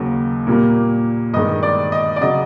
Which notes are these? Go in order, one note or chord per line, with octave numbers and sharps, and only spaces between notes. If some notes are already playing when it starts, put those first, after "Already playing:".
Already playing: D#2 C#3 F#3 A#3
A#2 G3 A#3
G2 D#3 G#3 D#5
D5
D#5
D5
C#3 F#3 D#5